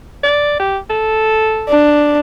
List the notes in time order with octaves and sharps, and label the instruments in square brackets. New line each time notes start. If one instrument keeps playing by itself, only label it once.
[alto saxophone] D5
G4
A4
[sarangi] D4